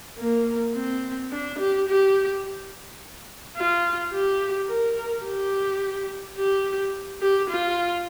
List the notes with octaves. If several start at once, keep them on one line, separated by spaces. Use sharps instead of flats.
A#3
C4
D4
G4
G4
F4
G4
A#4
G4
G4
G4
F4